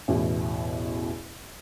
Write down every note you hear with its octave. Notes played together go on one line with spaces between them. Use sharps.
A1 E2 B2